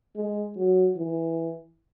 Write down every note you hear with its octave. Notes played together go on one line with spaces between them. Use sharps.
G#3
F#3
E3